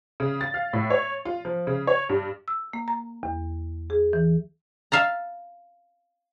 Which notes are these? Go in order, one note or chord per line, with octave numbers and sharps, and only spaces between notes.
C#3
A6
F5
A2
C#5
F4
F3
C#3
C#5
G2
E6
A#3
A#5
E2
G#4
E3
E5 F5 A5 A#5